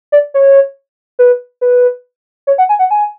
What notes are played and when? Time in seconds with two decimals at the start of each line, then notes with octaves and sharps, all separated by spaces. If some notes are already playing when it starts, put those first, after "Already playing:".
0.12 D5
0.34 C#5
1.19 B4
1.61 B4
2.47 C#5
2.58 F#5
2.69 G#5
2.79 F#5
2.91 G#5